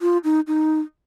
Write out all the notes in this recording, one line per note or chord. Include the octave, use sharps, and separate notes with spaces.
F4
D#4
D#4